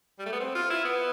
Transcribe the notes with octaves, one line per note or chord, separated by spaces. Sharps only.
G3
A3
B3
C4
F4
E4
B3